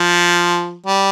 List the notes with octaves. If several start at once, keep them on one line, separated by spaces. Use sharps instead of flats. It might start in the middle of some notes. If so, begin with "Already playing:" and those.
Already playing: F3
G3